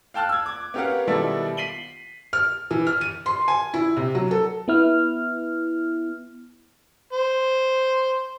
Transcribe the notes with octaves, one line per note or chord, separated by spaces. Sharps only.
F5 G5 A5 F6 F#6
E6 G#6
D6 G#6
B3 C#4 G4 A#4 F5 F#5
B2 D#3 G3 E4 A4
B6 C7 D#7 F#7 G7
F6
E3
F6
D#7
C6
G#5
E4
C3
F#3
A4
B3 E4 F6
C5